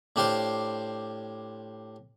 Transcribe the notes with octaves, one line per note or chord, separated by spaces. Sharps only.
A2 D4 G4 C5 F5 C6